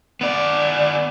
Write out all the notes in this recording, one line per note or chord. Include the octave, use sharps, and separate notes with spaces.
B3 D5